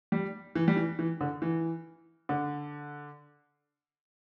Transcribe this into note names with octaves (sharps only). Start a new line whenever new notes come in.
G3
E3
G3
E3
E3
D3
E3
D3